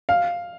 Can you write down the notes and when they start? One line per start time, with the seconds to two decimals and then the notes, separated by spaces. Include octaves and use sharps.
0.09 F5